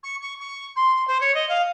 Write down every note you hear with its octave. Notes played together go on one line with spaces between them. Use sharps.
C#6
C#6
C#6
C6
C5
C#5
D#5
F5